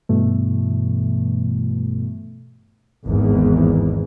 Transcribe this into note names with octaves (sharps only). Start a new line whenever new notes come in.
G2 B2 E3 A3
G#1 E2 G#2